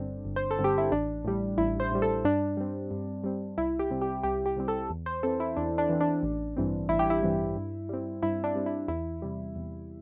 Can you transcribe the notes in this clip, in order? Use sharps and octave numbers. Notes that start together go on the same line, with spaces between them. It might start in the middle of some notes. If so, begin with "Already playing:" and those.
Already playing: G1 G2 D3 C4 D4
G1
C5
A4
G2 D3 C4
G4
E4
A1 D4
A2 G3
A1 E4
C5
A2 G3
A4
G2 D4
G3 C4
G2
G3 C4
C2 E4
G4
C3 G3 C4
G4
C2 G4
G4
C3 G3 C4
A4
E2
C5
E3 C4 A4
E4
E2 D4
D4
E3 C4
D4
A1
G2 E3 C4
A1 E4
G4
E4
G2 E3 C4
G2
G3 C4
G2 E4
D4
G3 C4
E4
E2 E4
C3 G3
E2